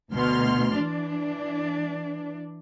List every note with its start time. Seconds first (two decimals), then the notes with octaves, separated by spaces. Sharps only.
0.11 D2 B2 C6 F6
0.76 E3 D4